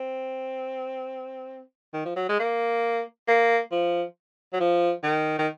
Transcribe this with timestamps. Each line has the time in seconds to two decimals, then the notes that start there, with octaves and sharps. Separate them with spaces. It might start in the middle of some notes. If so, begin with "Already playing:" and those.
Already playing: C4
1.93 D#3
2.05 F3
2.16 F#3
2.29 G#3
2.40 A#3
3.28 A#3
3.72 F3
4.53 F#3
4.60 F3
5.03 D#3
5.39 D#3